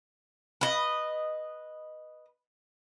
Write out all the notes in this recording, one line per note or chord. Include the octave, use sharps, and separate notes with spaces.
B4 D#5